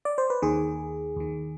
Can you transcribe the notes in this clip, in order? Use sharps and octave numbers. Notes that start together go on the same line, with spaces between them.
D5
C5
B4
D#2 D#3 G#4
D#2 D#3